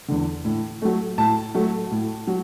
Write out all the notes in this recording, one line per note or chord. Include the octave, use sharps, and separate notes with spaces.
E2 D3
A2
F#3 A3
A2 A5
F#3 A3
A2
F#3